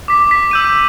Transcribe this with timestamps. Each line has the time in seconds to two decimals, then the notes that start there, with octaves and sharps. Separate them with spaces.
0.08 D6 B6
0.31 B6
0.51 E6 G6 D#7